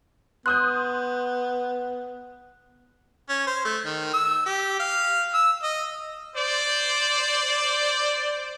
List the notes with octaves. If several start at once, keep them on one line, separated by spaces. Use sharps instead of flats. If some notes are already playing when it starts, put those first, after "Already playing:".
B3 C6 D#6 F#6 G6
C#4
C5
A3
D#3
E6
G4
F5
E6
D#5
C5 D5